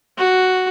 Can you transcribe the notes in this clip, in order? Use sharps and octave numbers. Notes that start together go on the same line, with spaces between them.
F#4